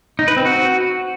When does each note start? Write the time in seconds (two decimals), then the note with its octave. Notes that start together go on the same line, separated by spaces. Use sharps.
0.19 D#4
0.28 B4
0.37 C4
0.45 F#4